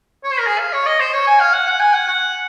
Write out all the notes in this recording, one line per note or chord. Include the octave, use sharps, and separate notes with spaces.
C#5
C5
A#4
G#4
F5
C#5
D#5
C5
C#5
G#5
F5
F#5
F#5
G#5
F#5
F#5